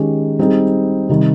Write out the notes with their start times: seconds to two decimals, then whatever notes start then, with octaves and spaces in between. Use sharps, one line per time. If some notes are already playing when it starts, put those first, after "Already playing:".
Already playing: D#3 G#3 C#4 G4
0.39 G3 C4 D#4 G#4
1.09 C3 D#3 G3